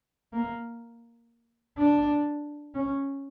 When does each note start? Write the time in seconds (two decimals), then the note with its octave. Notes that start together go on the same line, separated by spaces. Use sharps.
0.33 A#3
1.78 D4
2.74 C#4